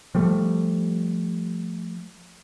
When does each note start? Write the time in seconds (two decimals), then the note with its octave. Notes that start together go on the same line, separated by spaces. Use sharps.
0.15 F3 G3 A3